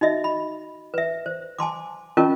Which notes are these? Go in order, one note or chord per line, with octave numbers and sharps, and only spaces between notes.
D#4 F#4 D#5 E5
B5
B4 E5
C5
G#5 A5 C6 D6
C#4 F4 A#4 D#5 A5 C#6